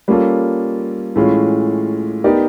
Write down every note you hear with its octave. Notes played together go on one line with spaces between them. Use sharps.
G3 A#3 C#4 F4 A4
A2 E3 G#3 C#4 F4
B3 D#4 G4 A#4 D5